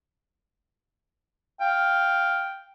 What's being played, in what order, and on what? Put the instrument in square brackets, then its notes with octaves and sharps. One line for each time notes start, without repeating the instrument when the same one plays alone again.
[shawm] F5 [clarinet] G5